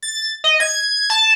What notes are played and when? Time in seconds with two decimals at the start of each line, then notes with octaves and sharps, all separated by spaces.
0.02 A6
0.44 D#5
0.60 G#6
1.10 A5